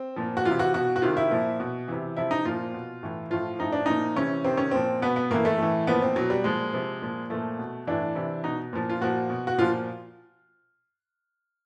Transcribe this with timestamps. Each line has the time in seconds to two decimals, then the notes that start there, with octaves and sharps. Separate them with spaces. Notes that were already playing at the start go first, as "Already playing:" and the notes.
Already playing: C4
0.16 A#2 F3
0.37 F#4
0.45 C3 E3 F4
0.59 F#4
0.74 B2 F#4
0.96 F#4
1.02 C3 D#3 F4
1.17 E4
1.31 A#2 F3
1.60 B2
1.88 C3 E3
2.17 C3 F3 E4
2.31 D#4
2.45 A#2 F3 F4
2.73 B2
3.03 A2 E3
3.30 A2 F3 F4
3.59 A2 F3 D#4
3.72 D4
3.86 A#2 F3 D#4
4.16 C3 E3 C#4
4.44 C3 D#3 C4
4.57 C#4
4.71 A#2 F3 C4
5.02 B2 B3
5.16 B3
5.30 A2 E3 A#3
5.45 A3
5.58 A2 E3
5.87 A#2 F3 B3
6.02 C4
6.16 B2 F#3
6.30 G3
6.44 A#2 F3 G#3
6.73 C3 F3
7.02 A#2 F3
7.30 A#2 F3 A3
7.59 B2
7.87 A2 E3 D4
8.15 C3 E3
8.44 B2 D#4
8.73 A#2 F3
8.90 F4
9.01 A#2 F3 F#4
9.30 B2
9.47 F#4
9.58 A#2 F3 F4